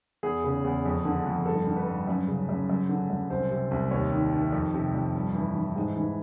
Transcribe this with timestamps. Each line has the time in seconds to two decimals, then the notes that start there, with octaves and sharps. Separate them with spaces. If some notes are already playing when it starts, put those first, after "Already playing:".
0.23 E2 G#4
0.44 C#3
0.65 E2
0.86 F2
1.05 D3
1.26 F2
1.46 G2 A4
1.67 D3
1.77 B4
1.87 G2
2.07 F#2
2.28 C#3
2.49 F#2
2.70 F#2
2.89 D3
3.10 F#2
3.30 C2 C5
3.51 C3
3.71 C2
3.91 D#2 C#5
4.11 D#3
4.33 D#3
4.52 F2
4.74 C3
4.94 F2
5.15 G2
5.35 E3
5.55 E3
5.76 G#2
5.96 E3